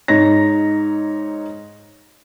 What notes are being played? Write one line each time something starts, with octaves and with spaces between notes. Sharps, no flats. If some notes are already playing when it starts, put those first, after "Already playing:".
G#2 D#4 C#5 A#6